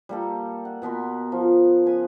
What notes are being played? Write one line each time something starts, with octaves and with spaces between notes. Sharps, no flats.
G3 A#3 A4
F#5
B2 B3 A#4 C6
F3
C#3 B4 G#5